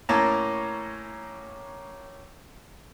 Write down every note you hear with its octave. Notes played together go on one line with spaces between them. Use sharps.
A2 A#3 C#4 A5 A#5